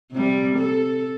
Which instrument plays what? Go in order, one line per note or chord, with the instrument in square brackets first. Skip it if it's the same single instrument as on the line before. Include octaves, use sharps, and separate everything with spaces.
[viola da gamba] C3 G3
A4